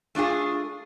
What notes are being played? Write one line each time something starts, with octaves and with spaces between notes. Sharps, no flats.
A3 D4 F4 G#4